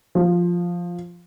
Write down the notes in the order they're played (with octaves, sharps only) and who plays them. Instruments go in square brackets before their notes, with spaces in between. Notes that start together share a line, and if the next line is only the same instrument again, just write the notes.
[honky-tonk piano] F3